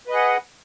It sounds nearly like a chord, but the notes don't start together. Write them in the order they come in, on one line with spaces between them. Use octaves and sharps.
B4 D#5 G#4 F#5